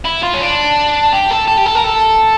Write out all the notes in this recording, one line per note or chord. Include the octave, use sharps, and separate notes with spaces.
E4
F4
C#4
D4
G4
A4
A4
G4
A4
A#4
A4